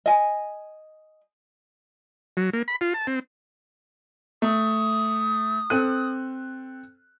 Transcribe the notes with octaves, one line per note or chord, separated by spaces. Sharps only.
D#5 G#5
F#3
A#3
B5
F4
A5
C4
A3 D#6
C4 A4 F#6 D#7